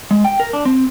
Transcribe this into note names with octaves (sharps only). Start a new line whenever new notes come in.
G#3
G5
A#4
D4
C4